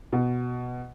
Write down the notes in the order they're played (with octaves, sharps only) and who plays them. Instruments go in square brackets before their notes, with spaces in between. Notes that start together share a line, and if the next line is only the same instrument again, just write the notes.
[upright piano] B2